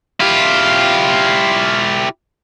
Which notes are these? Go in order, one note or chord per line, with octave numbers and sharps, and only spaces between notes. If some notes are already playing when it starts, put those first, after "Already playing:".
E4 F4 G4